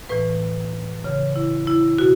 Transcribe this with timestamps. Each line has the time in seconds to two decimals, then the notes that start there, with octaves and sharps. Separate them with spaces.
0.09 A2 E3 B4
1.04 C#3 E3 C#5
1.36 E4
1.67 E4
1.98 B2 F#4